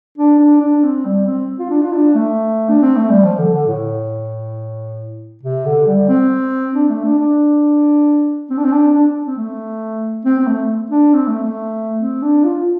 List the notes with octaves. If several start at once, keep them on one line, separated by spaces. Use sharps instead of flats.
D4
D4
D4
C4
G3
C4
F4
D4
F4
D4
A3
D4
C4
A3
G3
F3
D3
D3
A2
C3
D3
G3
C4
D4
A3
D4
D4
C4
D4
C4
D4
D4
C4
A3
C4
C4
A3
D4
C4
A3
A3
C4
D4
F4